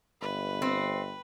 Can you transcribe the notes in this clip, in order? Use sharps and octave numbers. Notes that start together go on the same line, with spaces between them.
G1 B4
C4